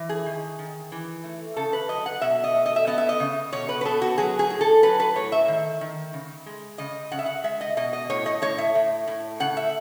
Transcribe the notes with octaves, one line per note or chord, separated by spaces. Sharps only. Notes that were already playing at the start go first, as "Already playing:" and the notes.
Already playing: E3
G#4
D#3
D#3
E3
A3
C#3 A4
B4
F#3 D#5
F#5
B2 E5
D#5
A3
D#5
E5
B3 D#5
E5
D#5
C#3
B2 C#5
B4
B4
B3 A4
F#4
F#3 G#4
G#4
A2
A4
F#3 B4
B4
A2 C#5
E5
D#3
D#3
C#3
G#3
C#3 D#5
C#3 F#5
E5
F#5
G#3 E5
D#5
B2 D#5
D#5
A2 C#5
D#5
A2 C#5
E5
A2
A2
C#3 F#5
E5